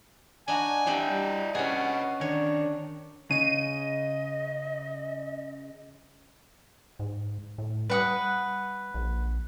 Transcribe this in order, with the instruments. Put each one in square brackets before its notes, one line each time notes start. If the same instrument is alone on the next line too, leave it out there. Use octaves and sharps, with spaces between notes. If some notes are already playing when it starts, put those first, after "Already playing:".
[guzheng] D4 D#4 F#4 [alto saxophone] G#5
[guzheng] C4 D4 G4 [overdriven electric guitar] E4 D#5
[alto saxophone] G3
[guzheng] C#4 G#4 [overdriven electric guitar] B4 D#5 [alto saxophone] F#5
[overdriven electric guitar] D#3 [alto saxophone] D4 [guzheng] C#5
[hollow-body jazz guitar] C#3 [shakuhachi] D#5 [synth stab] D#7
[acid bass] G#2
A2
[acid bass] G3 [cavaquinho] B4 F#5 D#6
[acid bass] A#1